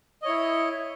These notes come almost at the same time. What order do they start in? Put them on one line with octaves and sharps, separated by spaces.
D#5 C#5 E4